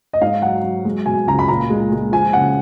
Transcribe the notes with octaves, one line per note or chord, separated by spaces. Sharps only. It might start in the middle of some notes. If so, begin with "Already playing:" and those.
D#5
G#2 F5
F#3 F#5
F#3
G#3
B2 G#5
C#2 A#5
B5
A#2 A#5
G#3
G#3
F3 G#5
C#3 F#5